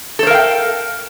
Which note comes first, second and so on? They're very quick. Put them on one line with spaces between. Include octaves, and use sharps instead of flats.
A4 C5 A#4 F5 G5